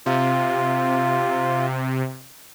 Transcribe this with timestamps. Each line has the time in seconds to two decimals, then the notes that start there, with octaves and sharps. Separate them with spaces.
0.06 C3 F4